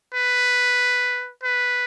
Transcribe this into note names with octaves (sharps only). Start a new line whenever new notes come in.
B4
B4